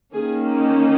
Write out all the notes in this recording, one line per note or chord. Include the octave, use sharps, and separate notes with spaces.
D#3 A#3 C#4 G#4